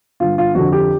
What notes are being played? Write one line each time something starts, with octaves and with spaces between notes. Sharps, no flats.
G1 F4
F4
F2 D3 F#4
G4